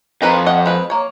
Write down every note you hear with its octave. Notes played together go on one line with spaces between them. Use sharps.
F2 D#3 B4 A#5
D#5 F#5
G#3 B4
A#3 C#5